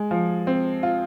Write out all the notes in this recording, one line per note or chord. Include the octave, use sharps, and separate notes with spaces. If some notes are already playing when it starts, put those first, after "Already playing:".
Already playing: G#3
F3
C4
F4